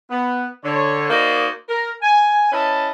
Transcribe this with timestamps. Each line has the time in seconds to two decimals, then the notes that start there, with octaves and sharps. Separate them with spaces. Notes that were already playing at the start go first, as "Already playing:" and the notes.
0.10 B3
0.64 D3 C#5
1.10 A#3 D#4 F#4 C5 D5 D#5
1.69 A#4
2.02 G#5
2.52 C#4 E4 B4 D#5 A5